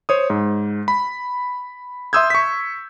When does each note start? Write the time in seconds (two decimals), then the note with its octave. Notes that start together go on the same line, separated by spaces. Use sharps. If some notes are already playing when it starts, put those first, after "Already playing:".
0.09 C5 C#5 D#6
0.30 G#2
0.88 B5
2.13 E5 C6 D#6 E6 G6 G#6
2.30 C#6 B6